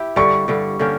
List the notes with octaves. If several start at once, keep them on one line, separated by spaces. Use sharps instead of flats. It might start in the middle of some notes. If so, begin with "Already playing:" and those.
Already playing: E4 G4
G2 D3 G3 C#6
G2 D3 G3
D3 A#3 C#4 G4